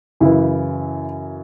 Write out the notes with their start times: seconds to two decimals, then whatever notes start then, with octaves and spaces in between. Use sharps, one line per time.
0.20 F#2 C#3 E3 E4